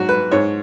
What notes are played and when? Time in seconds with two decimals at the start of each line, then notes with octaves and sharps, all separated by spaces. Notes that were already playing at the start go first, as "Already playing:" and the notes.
Already playing: G#2 F#3 F#4
0.09 B4
0.31 G#2 G#3 C#5